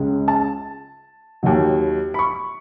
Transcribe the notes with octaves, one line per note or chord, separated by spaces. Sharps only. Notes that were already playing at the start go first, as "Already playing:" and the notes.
Already playing: C#2 C#3 G#3
A5
D#2 D#3 F#3
B5
C#6